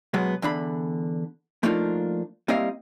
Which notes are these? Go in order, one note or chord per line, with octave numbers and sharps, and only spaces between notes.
B2 F#3 G#3 B3
E2 D3 D4 B5
F3 A3 A#3 D4 D#4 F4
G3 A#3 C4 E4 D#5 F5